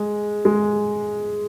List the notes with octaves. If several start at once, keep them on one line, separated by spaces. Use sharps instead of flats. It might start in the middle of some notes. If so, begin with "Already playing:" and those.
Already playing: G#3
G#3